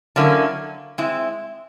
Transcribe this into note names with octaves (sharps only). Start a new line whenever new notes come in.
D3 F#3 A#3 C#4 E4
G#3 C4 E4